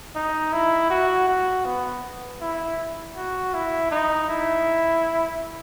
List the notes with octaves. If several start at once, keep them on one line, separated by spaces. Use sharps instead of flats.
D#4
E4
F#4
F#4
B3
E4
F#4
E4
D#4
E4